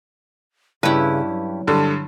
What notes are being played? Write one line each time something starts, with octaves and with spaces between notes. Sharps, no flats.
G2 C#3 C#4 E4 G4 B4
F#3
G2 D3